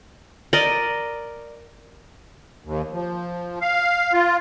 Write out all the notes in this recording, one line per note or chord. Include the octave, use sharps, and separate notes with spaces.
A#4 D5 D#5
D#2
F3
F5
F4